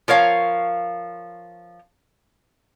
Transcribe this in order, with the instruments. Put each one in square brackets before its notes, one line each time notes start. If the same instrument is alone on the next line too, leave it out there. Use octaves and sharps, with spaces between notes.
[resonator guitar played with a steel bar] F3 A#4 C#5 F5